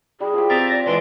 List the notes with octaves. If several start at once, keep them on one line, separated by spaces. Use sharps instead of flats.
G3 E4 G#4
F3 G4
C4 E5 A#5 A6
D5 A#6
E3 G#3 D4 C#5 C6